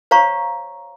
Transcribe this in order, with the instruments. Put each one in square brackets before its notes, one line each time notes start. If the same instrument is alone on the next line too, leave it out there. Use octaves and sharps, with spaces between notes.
[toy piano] C5 C#5 F5 A#5 C#6